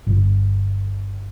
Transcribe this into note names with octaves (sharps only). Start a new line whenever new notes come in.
G1